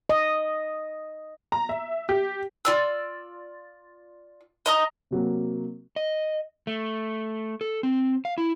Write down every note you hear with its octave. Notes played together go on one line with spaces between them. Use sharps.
D#5
A#5
E5
G4
F4 D5 E6
D#5 A#5 D#6
C3 F#3 A#3
D#5
A3
A4
C4
F5
E4